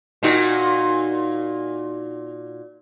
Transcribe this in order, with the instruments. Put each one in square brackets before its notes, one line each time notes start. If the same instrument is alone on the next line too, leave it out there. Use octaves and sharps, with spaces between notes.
[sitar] A#2 D#4 F#4